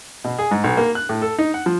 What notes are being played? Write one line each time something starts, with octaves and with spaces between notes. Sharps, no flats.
B2
G#4
G#2
B1
A#3
F#6
A2
A4
D#4
F#5
F3